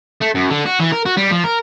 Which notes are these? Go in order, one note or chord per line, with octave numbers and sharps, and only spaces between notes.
A3
F#2
D3
F#4
E3
A#4
F#4
G3
F3
A#4